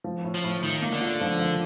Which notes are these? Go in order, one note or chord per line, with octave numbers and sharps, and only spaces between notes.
F3
A2
F3
A2
A2 D#3
A#3
D3
F4
F3
F3